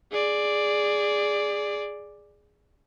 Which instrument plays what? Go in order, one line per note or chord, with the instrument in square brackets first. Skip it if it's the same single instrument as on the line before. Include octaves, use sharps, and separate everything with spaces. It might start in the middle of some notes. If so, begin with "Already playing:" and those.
[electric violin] G#4 D5